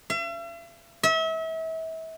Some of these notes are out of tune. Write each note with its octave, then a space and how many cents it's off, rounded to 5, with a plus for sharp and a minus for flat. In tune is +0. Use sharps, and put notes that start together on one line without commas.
E5 +45
E5 -35